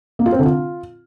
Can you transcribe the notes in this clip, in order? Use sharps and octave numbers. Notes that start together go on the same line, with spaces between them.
A#3
F4
C4
D3
F4